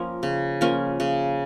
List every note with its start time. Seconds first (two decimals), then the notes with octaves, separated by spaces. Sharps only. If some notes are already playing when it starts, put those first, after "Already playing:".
Already playing: F3 A#3 C#4
0.23 C#3
0.61 F3 A#3 C#4
1.00 C#3